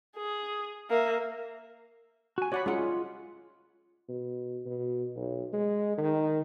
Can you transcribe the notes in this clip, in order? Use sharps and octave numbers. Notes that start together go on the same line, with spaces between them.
G#4
A#3 E5
F#4 G#5
F#4 C#5 D5 F#5 B5
G#3 C#4 F4 F#5
B2
B2
B1
G#3
D#3